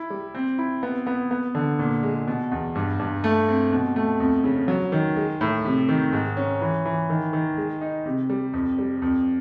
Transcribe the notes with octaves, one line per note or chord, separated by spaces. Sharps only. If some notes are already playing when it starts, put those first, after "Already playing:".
Already playing: E4
G3
C4
E4
B3
B3
B3
D3
A#2
G#3
B2
E2
G2
G2
A3
C4
B2
A3
F2
C#3
F#3
D#3
G#3
A2
C3
D#3
G#2
C#4
E3
E3
D#3
D#3
G#3
D#4
C3
G3
F2
G3
F2